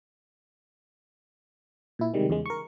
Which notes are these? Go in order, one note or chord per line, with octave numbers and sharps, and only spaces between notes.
A#2 E4
C3 D#3 G3 G#3
E2 C#3 G#3
A#4 C#6